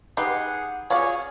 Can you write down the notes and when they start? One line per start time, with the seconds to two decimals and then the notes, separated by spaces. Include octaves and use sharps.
0.17 D#4 G4 G#4 B4 F#5 C6
0.90 C#4 F4 F#4 G#4 C#5 D5